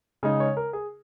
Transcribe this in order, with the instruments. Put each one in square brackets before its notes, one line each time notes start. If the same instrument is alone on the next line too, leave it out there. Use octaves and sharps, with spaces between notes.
[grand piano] C#3 G#3 D#4 G#5
C#5
A#4
G#4